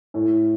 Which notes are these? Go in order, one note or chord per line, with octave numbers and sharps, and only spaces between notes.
A2